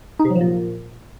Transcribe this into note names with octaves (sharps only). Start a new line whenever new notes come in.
D#4
C3
F#3
F3
A#2